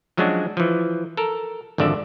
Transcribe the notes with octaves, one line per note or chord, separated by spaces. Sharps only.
F3 F#3 G#3 C#4 D4 F#4
E3 F3
A4 A#4
G#1 F2 D3 D5 E5